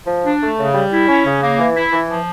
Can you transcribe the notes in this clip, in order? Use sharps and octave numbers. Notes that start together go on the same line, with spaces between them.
F3
D4
A3
C#3
G3
E4
C#4
C#3
A#3
E3
E4
E3
F3